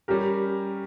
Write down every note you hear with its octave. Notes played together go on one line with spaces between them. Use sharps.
G3 C#4 G4 A#4